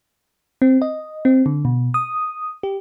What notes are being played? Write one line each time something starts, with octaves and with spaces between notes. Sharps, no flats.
C4
D#5
C4
D3
B2
D#6
G4